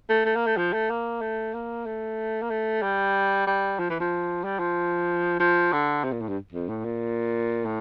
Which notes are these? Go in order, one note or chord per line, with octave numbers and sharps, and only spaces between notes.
A3
A3
A#3
A3
F3
A3
A#3
A3
A#3
A3
A#3
A3
G3
G3
F3
E3
F3
G3
F3
F3
D3
C3
A#2
A2
G2
F2
A2
A#2
A2